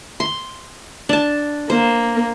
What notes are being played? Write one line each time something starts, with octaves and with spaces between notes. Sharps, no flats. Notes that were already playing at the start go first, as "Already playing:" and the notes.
C6
D4 A5
A#3 C5